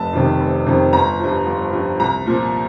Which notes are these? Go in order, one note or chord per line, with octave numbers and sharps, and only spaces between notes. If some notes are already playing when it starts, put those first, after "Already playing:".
Already playing: F1 A5
F2 C3 D#3
F1
F2 C3 D#3
G1 A#5
G2 F3
G1
G2 F3
C2 A#5
A#2 F3